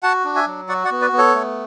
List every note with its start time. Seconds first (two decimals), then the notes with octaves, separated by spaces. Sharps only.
0.03 F#4 F#5 A5
0.25 D4
0.35 E5 G#5
0.47 F#3
0.69 F#4 D5 F#5
0.85 D5 F#5
0.91 B3
1.01 B4 D5
1.13 B3
1.18 A4 C#5
1.34 A3